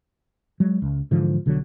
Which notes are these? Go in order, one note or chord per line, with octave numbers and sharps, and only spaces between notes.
F#3 G#3
C#2
G#2 D3 E3 F3
B1 D3 E3 F#3